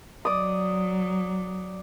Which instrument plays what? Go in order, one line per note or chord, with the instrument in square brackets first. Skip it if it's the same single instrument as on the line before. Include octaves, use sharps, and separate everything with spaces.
[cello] F#3 [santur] D5 D#6